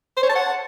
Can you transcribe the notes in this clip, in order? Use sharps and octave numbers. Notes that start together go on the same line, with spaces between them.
C5
C#5
A5
F#5